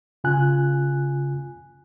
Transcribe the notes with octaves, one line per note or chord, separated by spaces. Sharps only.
C#3 F4 G#5 F#6